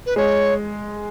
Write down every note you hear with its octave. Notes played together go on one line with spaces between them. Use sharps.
B4
G#3 C#5